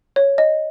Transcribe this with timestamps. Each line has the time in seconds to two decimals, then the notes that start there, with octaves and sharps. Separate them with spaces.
0.16 C#5
0.38 D#5